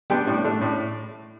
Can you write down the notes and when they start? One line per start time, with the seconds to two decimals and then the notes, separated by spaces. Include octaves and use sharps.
0.10 G3 B3 D4 G5
0.27 A2
0.44 A3 D4
0.61 A2